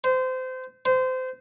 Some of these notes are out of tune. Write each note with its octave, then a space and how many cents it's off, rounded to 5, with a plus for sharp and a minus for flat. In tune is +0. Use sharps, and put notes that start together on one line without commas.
C5 -25
C5 -25